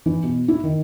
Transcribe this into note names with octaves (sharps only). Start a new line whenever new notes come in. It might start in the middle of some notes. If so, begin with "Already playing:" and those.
E3
B2
E4
D#3